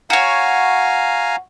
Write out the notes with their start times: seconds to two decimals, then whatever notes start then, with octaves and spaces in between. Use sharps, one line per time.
0.10 F#4 C#5 F5 G#5 A#5